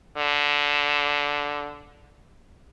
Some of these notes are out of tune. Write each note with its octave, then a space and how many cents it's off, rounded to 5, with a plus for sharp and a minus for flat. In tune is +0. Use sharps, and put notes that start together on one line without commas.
D3 -10